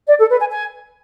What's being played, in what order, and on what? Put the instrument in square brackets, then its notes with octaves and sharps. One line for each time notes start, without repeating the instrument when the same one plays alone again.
[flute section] D5
A4
B4
G#5
G#5